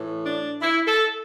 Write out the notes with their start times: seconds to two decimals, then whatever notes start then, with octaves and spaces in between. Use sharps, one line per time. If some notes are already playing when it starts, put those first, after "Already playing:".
Already playing: A2 E3
0.24 D4
0.62 E4
0.87 A4